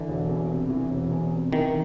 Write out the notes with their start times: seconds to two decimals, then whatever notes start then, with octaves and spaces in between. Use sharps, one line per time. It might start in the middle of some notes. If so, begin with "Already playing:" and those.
Already playing: D3 E3
0.09 E1
0.29 E2
0.50 C3
0.70 E3
0.91 E1
1.11 E2
1.32 C3
1.52 D#3 E3